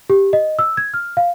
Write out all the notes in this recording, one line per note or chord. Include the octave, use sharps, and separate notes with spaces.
G4
D#5
E6
G#6
F6
F5